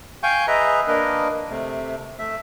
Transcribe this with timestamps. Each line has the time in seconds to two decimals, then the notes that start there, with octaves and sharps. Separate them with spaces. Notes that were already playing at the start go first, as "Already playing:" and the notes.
0.23 F5 G5 G#5 C#6 G6
0.48 G#4 B4 D#5 E5 A#5
0.88 A#3 D4 A#4 B4 D#5
1.50 C3 A3
2.19 A3 E5